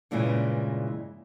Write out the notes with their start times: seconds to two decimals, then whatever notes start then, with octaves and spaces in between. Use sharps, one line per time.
0.11 G2 A#2 C#3 E3 G#3